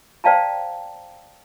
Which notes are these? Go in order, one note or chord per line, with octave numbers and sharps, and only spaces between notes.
C5 D5 F5 G5 A5 A#5